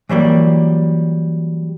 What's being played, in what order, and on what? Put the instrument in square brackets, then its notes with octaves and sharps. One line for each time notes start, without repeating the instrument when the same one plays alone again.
[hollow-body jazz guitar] E3 F#3 G3 A#3